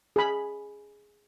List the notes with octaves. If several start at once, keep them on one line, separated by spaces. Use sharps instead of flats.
G#4 B5